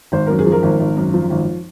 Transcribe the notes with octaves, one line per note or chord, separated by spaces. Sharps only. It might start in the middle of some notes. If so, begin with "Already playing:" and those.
G#1 C5
F#2 A#4
G#4
F3
A#4
G#1
G#1
F#2
F3
G#1